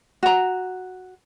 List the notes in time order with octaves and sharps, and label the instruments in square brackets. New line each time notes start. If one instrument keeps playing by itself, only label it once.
[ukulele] F#4 A#5